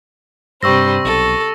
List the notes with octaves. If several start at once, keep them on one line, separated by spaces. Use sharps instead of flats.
G2 C3 G3 C5 C#6 E6 A#6
B1 A4